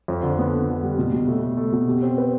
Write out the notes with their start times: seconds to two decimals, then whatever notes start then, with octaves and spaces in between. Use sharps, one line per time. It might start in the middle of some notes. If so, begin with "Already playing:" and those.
0.08 F2
0.23 D3
0.39 B3
0.53 D3
0.69 D3
0.83 G3
0.98 B2
1.12 B2
1.28 A3
1.43 A3
1.57 A3
1.73 B2
1.88 G4
2.02 C4
2.18 B4